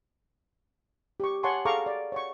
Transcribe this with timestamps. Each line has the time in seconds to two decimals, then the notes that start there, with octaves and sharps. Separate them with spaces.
1.20 G4 C#6
1.43 C#5 F#5 G#5 A5 C6 C#6
1.65 G#4 A4 F5 A#5 C#6 D6
1.86 D5
2.12 C#5 F#5 C#6